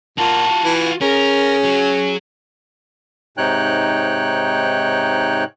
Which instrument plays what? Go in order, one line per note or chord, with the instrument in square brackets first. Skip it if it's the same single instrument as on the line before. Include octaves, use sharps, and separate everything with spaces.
[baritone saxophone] A#2 [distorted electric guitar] F4 F#4 [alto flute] A5
[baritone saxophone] E3
[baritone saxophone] C#4 [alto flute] G#4 [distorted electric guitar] A#4
[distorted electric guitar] F#3
[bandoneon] G#2 C3 D#4 C#5 G5 F#6